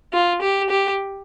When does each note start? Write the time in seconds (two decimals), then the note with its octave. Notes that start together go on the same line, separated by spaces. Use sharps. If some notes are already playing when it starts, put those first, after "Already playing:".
0.13 F4
0.41 G4
0.69 G4